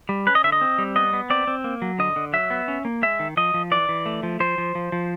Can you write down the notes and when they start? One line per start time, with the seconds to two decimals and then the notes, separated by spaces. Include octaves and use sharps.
0.09 G3
0.27 C#4 B4
0.35 D#5
0.44 D3 E5
0.52 D#5
0.61 C4
0.78 G3
0.96 B3 D#5
1.13 B3
1.30 C4 D5
1.47 C4
1.64 A#3
1.82 F#3
1.99 D3 D#5
2.16 D3
2.33 F#3 E5
2.50 B3
2.68 C#4
2.85 A#3
3.02 G#3 E5
3.20 D#3
3.37 F3 D#5
3.54 F3
3.71 E3 D5
3.89 E3
4.06 A3
4.23 F3
4.40 F3 C5
4.58 F3
4.75 F3
4.92 F3